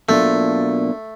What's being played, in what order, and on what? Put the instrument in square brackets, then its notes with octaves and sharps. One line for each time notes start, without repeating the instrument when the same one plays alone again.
[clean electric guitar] B2 F#3 A#3 D4 F4 [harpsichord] A3